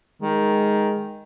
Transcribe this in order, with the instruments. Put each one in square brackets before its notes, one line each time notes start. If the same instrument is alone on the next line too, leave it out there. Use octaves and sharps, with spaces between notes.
[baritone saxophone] D#3 [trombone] G#3